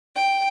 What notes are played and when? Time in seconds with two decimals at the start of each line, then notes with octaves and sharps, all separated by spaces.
0.15 G5